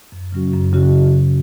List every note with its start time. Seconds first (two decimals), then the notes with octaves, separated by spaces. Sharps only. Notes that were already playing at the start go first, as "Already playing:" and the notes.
0.12 F#2
0.33 C#3 F#3 C#4 F#4
0.53 F#2
0.73 C#3 F#3 C#4 F#4